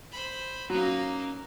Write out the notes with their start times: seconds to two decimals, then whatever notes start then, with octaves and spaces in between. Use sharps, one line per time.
0.12 C5 B5
0.70 F#3 A#3 C#4 D#4